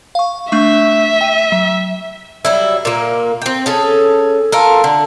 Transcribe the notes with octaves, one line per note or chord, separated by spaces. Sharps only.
F5 C#6
A3 D4 E5 C#6
G5 D#7
F#3
F#3 G3 E4
A#2 A#3
C4 G5
C#4 G#4 A4
F4 A4 A#4
D3